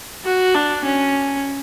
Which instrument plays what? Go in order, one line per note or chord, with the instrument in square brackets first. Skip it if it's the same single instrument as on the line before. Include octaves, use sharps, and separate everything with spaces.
[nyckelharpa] F#4
D4
C#4